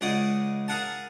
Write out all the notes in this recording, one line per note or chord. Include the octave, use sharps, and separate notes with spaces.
C#2 C#3 G#4 D5 D#5 F#5
G#4 A#4 F5 F#5 G#5 A5